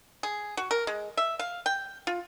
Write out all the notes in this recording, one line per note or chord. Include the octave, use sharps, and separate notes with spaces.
G#4
F#4
A#4
G#3
E5
F5
G5
F4